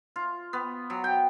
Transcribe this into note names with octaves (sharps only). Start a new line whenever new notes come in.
F4
B3
F#3
G5